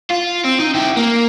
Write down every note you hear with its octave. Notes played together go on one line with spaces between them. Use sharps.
F4
C4
D#4
E4 G4
A#3